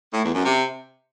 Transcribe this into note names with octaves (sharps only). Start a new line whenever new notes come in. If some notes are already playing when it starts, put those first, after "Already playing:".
A2
E2
F#2
C3